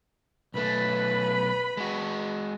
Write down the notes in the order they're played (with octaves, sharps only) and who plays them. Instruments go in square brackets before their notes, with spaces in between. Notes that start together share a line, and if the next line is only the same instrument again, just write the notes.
[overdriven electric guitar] B1 A3 [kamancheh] B4 B5
[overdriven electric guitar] G#3 F#4